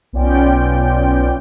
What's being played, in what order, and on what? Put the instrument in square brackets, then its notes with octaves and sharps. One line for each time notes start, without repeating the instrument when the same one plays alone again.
[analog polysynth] B1 B3 C#4 F4 D5 G5